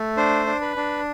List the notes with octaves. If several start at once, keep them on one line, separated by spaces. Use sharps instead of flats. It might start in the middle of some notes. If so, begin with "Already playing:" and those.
Already playing: A3
D4 C5
D4
B4
D4